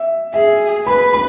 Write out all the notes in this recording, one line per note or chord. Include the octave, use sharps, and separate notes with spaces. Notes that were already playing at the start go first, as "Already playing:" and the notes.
Already playing: E5
G#4 E5
B4 B5
B5